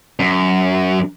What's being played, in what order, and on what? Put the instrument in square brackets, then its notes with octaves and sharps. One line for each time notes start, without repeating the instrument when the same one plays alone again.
[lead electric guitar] F#2